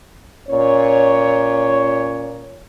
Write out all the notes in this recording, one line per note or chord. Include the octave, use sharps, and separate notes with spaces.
A#2 C#4 C#5